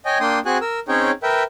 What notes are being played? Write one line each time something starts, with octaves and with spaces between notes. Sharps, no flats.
C#5 D#5 G5 G#5
A#3 D4 G5 C6 D#6
C4 F#4 G#4 G#5 F#6
A#4 E6
C4 C#4 D#4 G#4 C#5 G5
A#4 B4 E5 G5